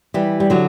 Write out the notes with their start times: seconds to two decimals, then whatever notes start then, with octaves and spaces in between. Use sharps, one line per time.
0.14 E3 G3
0.40 G3
0.50 D3 F#3